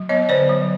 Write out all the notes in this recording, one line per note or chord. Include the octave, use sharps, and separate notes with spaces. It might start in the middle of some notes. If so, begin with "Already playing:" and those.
Already playing: F#3
B3 C#5 D#5
D3 C5 D5
F#3